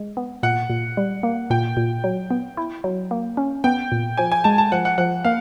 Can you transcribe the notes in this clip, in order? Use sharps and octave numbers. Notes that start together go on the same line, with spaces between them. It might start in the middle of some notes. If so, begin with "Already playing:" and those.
Already playing: G#3
B3
A#2 F#5
A#2
G3
A#3
A#2 G5
A#2
F#3
B3
E4
F#3
A#3
C#4
B3 G5
A#2
F3 G#5
G#5
G#3 A5
A5
F3 F#5
F#5
F3 F#5
A#3 F5